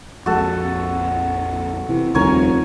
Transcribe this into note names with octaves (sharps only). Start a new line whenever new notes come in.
A#1 F2 G#3 F#4 A4
C3 E3
F1 D#2 C#3 G3 A#4 C#5 G#5